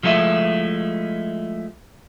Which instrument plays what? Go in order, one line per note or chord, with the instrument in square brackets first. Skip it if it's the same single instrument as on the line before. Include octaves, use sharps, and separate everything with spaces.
[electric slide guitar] F3 G#3 A3 D4 E4